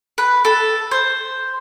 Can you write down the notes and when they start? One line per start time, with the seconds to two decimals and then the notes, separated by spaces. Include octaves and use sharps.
0.18 B4
0.45 A4
0.91 C5